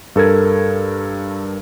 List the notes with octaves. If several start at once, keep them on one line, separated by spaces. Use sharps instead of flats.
G2 A4 A#4 G#6